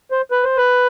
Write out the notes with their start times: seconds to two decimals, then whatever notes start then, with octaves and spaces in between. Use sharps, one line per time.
0.11 C5
0.31 B4
0.44 C5
0.57 B4